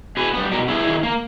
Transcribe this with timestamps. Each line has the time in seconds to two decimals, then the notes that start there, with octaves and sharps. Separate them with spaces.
0.17 B2 G#4 B4
0.33 G3 B3
0.51 B2 G4 A#4
0.68 G3 B3 E4 G#4
0.85 D#3
1.03 A#3